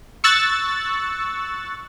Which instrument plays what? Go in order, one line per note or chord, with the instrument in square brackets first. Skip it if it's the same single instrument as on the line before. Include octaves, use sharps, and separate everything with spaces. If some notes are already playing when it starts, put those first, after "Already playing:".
[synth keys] C#6 E6 F#6 A6